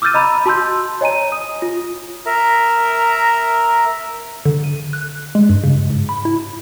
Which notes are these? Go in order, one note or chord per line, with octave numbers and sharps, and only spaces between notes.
D6 E6 F6 G6 A6 D#7
D#5 A#5 B5
F#4 A5 C6 E6 G6
C#5 D#5 G#5 A#5 D#7
D#6
F4
A#4 E5 A#5
D3
D#7
F#6
G#3
G2
C#3
G#2
B5
E4